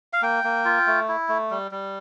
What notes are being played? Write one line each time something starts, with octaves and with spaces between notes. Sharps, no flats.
F5
A#3 G5
A#3
F4
A3
E4
A3
G3
G3